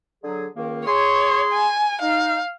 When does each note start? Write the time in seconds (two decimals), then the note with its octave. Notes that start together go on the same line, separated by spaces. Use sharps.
0.23 D3 F#3 G#4
0.56 C#2 D#3 A#3
0.86 G#4 C#5 C6
1.53 G#5
2.02 D#4 F5